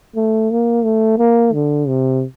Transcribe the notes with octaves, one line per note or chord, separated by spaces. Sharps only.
A3
A#3
A3
A#3
D3
C3